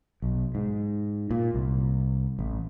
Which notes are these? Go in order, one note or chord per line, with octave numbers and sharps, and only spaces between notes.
B1
G#2
A#2
C2
A1